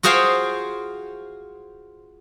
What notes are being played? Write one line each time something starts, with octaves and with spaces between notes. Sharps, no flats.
F4 F#4 G#4 C5 F5 G5